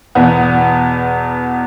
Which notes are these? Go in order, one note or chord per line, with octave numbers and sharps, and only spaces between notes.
E2 B2 B3